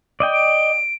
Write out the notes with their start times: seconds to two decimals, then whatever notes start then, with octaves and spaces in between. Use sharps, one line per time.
0.20 D5 D#5 G5
0.33 D7